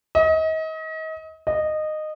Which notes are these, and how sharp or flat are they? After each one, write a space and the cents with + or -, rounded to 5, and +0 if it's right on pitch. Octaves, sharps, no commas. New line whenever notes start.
D#5 +35
D#5 -15